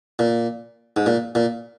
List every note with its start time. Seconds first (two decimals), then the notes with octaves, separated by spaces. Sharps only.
0.19 A#2
0.97 G#2
1.06 A#2
1.35 A#2